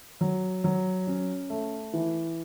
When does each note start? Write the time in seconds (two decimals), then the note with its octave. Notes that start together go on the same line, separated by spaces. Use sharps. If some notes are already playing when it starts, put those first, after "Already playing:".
0.21 F#3
0.64 F#3
1.07 C#4
1.50 A3
1.93 E3